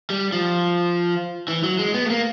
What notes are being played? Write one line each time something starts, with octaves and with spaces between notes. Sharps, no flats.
G3
F3
E3
F#3
G#3
B3
A3
A#3